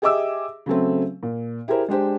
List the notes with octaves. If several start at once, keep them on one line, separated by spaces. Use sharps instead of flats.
G4 G#4 D#5 E5 D6 E6
C#3 F#3 A3 C4
A#2
E4 G4 G#4 A#4 C5
G#3 D4 G4 C5